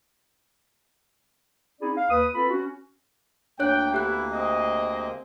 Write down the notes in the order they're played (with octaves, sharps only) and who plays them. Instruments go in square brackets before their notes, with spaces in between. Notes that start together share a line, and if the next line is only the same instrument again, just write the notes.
[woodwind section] C4 C#4 D#4 E4 G#4 D5
F5
D#2 B4 D#6
C4 F4 A4 B4 B5
C#4 F#4
[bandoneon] D2 A#3 [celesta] D4 C#5 F#6 [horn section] G5
[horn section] A3 B3 E4 [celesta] G4 F#6
[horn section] C4 G#4 D#5